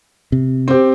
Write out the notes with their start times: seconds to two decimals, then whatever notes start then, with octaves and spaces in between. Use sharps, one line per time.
0.32 C3
0.68 C4 G4